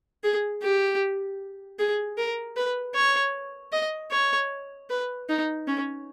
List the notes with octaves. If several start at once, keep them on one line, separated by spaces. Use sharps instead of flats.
G#4
G4
G#4
A#4
B4
C#5
D#5
C#5
B4
D#4
C#4